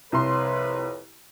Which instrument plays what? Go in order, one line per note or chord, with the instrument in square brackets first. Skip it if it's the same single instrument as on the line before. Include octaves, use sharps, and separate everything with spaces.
[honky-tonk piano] C2 C6 [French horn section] F2 B4 C#5